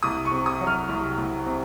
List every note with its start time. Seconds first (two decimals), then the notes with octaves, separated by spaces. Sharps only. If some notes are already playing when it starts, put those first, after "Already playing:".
0.03 C2 D#6
0.25 C#6
0.31 C3
0.46 D#6
0.61 F#3
0.67 F6
0.89 C2
1.18 C2
1.46 C3